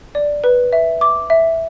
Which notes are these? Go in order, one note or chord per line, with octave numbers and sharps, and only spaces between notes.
D5
B4
E5
D6
E5